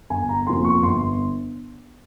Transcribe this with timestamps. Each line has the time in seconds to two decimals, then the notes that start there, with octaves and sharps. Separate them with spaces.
0.10 G1 G#5
0.29 A#5
0.47 F2 C3 F3 A#3 C6
0.65 C#6
0.83 G1 C6